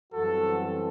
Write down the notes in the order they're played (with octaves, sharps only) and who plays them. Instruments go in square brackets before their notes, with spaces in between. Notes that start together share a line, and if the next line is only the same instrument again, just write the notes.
[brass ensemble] F#2 E3 G3 C4 F#4 A4